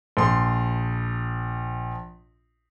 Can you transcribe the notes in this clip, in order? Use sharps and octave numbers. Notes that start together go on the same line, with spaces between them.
A#1 C6